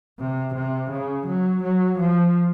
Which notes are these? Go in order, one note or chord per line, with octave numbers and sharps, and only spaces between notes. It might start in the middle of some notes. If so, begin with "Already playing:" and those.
C3
C3
C#3
F#3
F#3
F3